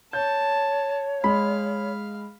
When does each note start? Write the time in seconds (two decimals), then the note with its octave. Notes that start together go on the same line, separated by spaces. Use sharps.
0.13 C#5 A5 G6
1.24 G#3 F5 B5